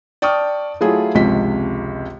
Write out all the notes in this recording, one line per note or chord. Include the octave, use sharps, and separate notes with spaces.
D5 G5 A5 C#6 D#6 F6
F#3 A3 E4 F4 G#4
G#1 C#2 C3 F3 B6